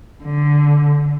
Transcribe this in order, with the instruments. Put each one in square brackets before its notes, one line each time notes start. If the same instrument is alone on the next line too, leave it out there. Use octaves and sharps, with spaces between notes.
[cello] D3